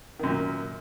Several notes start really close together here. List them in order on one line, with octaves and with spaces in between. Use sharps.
D#3 F#2 A#2